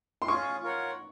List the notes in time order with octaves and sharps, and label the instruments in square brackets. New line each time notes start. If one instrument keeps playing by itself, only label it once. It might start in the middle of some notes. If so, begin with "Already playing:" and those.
[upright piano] C6
[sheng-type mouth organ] C#4 F4 G#4 [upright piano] C#6
[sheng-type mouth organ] F4 A#4 C#5 F#5